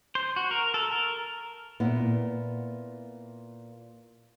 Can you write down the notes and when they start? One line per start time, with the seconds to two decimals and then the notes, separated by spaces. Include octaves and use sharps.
0.15 C5
0.36 F#4
0.51 A#4
0.74 A4
0.92 A#4
1.80 A#2 B3 E4